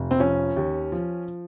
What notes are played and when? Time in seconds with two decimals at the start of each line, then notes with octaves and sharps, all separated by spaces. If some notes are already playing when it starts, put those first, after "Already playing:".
Already playing: F1
0.11 C4
0.19 F3 C#4
0.56 D#2
0.92 F3